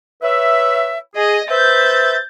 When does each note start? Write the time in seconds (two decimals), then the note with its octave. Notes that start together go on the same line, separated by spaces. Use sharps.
0.22 B4 C#5 E5
1.15 G#4 D#5
1.50 B4 C5 E5 G6 A6